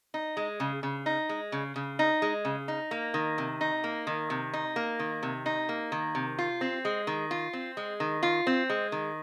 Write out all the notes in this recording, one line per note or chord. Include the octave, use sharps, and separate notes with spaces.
D#4
G#3
C#3
C#3
D#4
G#3
C#3
C#3
D#4
G#3
C#3
D#4
A#3
D#3
C3
D#4
A#3
D#3
C3
D#4
A#3
D#3
C3
D#4
A#3
D#3
C3
F4
C4
G#3
D#3
F4
C4
G#3
D#3
F4
C4
G#3
D#3